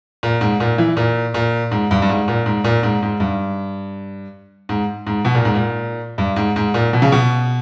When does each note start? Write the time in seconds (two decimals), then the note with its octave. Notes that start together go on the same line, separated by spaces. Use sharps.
0.23 A#2
0.41 G#2
0.60 A#2
0.78 E3
0.97 A#2
1.34 A#2
1.71 G#2
1.91 G2
2.02 G2
2.09 G#2
2.28 A#2
2.46 G#2
2.64 A#2
2.83 G#2
3.03 G#2
3.20 G2
4.69 G#2
5.07 G#2
5.25 B2
5.35 A#2
5.45 G#2
5.54 A#2
6.18 G2
6.36 G#2
6.56 G#2
6.74 A#2
6.93 B2
7.02 C#3
7.12 B2